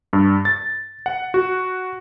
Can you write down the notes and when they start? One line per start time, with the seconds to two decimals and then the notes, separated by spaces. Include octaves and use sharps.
0.13 G2
0.45 A6
1.06 F#5
1.34 F#4